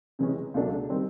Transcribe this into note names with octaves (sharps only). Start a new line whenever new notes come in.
C3 E3 G#3 C#4
C#2 B2 F#3 A3 D4
D#3 G3 C4